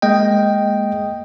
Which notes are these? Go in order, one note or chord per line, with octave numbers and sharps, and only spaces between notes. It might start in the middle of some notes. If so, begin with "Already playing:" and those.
G#3 A#3 D#5 G5